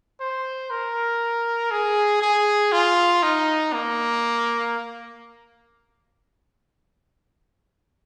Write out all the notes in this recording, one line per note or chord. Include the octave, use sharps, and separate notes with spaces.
C5
A#4
G#4
G#4
F4
D#4
A#3